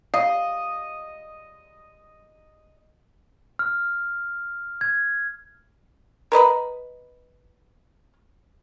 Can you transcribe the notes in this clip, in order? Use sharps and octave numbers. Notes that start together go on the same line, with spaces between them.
D#5 F5
F6
G#6
A#4 B4 D#5 B5